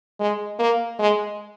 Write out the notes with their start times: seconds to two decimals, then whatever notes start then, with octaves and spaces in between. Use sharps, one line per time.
0.20 G#3
0.59 A#3
0.99 G#3